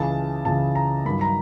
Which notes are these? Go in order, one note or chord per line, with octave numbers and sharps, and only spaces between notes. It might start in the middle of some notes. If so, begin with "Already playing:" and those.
Already playing: C#2 C#3 E3 A5
C#2 C#3 E3 A5
A#5
G2 D#3 F#3 B5
A#5